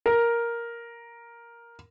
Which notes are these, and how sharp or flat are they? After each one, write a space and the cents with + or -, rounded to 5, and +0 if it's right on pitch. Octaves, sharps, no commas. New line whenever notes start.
A#4 +5